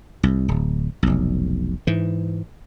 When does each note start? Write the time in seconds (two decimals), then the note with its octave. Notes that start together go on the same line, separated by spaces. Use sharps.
0.23 C2
0.48 D1
1.03 F1 B1
1.87 G#2 E3